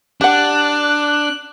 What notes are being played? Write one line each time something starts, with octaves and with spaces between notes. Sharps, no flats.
D4 G4 F#5 F#6